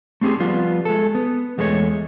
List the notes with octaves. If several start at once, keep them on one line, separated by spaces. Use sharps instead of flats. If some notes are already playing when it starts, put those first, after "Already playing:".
A3 C4 F4 G4 G#4
F3 G3 B3 F4
G#3 A4
B3
E2 G#3 A3 D#4 C#5